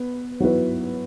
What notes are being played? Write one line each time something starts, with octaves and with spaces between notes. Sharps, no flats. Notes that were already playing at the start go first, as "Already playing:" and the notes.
Already playing: B3 B4
F#3 B3 E4 B4